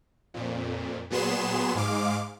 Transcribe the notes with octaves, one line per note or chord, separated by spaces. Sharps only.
F2 A#2
A#2 F#3 B3 G#4 C6 E7
G#2 G#3 F5 D6